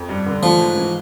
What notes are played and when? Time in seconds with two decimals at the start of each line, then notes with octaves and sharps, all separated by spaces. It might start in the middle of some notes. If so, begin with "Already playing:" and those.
Already playing: F2
0.09 G2
0.26 D3
0.42 F3 A3
0.59 G#2
0.76 E3